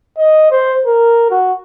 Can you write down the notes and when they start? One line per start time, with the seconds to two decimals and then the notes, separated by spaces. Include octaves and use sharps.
0.18 D#5
0.51 C5
0.86 A#4
1.31 F#4